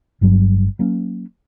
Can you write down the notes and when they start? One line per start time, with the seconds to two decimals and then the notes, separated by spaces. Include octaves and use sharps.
0.21 G1 G2 F#3
0.79 F#3 A#3 C#4